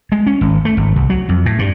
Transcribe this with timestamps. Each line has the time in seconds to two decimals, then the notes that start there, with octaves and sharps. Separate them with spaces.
0.12 G#3
0.27 C#4
0.41 G#1
0.65 A3
0.77 G#1
0.96 C2
1.10 F#3
1.29 F2
1.46 A2
1.59 G2